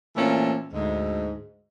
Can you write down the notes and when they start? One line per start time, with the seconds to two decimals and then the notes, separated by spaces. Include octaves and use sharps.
0.16 A#2 E3 A3 A#3 C4 C#4
0.73 D2 G#2